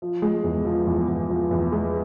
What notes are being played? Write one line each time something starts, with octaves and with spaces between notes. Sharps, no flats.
F3
G#3
E2
F3
E2
E2
F3
E2
G#3